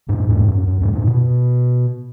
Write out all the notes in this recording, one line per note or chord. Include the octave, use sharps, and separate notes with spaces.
F#2 A2
E2 G#2
F#2
F#2
E2 G#2
F#2 A2
B2